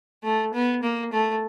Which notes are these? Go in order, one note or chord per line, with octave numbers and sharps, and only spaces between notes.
A3
B3
A#3
A3